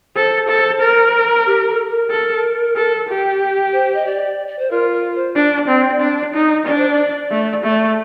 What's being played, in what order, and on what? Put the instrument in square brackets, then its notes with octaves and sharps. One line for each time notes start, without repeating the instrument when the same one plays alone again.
[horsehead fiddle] A4 [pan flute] C5
[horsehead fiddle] A4
A#4
[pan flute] G4
A4
A#4
[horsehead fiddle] A4
A4
G4
[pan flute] C5
D#5
D5
D5
C5
[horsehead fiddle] F4 [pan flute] A#4
[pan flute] A#4
C5
[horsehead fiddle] D4 [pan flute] D5
[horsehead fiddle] C4
D4
D#4
[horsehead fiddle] D4 [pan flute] D5
[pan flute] C5
D5
[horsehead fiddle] A3
A3